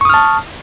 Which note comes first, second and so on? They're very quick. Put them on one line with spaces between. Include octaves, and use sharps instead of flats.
C#6 D#6 F6 A5